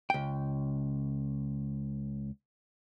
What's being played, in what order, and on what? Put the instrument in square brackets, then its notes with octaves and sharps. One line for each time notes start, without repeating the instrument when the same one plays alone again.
[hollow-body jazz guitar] C#2 G5